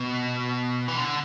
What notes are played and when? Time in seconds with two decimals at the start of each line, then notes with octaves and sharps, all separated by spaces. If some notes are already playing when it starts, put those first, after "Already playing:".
Already playing: B2
0.88 E3
0.96 D3